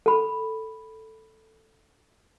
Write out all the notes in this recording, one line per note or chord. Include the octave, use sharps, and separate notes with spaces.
A4 B5